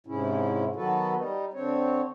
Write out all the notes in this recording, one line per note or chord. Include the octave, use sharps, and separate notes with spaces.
G#2 C3 G#3 C#4 E4
D#3 F#3 B3 F#4 A4 B4
G3 D#4
D3 C4 C#5